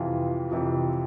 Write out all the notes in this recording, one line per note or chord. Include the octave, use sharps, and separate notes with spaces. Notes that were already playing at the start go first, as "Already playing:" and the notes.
Already playing: F2 C3 E3 F4
F2 C3 E3